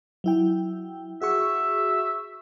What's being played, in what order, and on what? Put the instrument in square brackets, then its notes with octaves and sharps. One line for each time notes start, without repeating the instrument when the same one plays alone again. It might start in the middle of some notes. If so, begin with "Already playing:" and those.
[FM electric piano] F#3 E4 G5
[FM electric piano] F#4 G#4 C#6 [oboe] E5